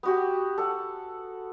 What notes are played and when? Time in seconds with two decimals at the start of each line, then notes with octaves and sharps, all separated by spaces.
0.03 B3 F#4 G4
0.58 A4 F#5